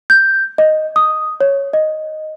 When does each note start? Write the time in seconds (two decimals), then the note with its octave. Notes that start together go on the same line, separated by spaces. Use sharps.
0.10 G6
0.58 D#5
0.96 D#6
1.41 C#5
1.73 D#5